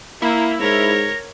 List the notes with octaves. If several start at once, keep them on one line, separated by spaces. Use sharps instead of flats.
A#3 E4 A#5
G#2 A#4 C#5 A#6